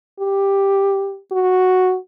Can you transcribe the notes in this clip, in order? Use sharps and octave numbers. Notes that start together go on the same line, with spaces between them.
G4
F#4